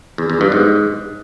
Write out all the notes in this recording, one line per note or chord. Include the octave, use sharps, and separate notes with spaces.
E2
E2
G2
G#2